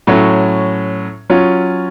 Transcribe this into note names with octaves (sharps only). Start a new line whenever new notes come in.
A2 F#3 C#4
F#3 C#4 F4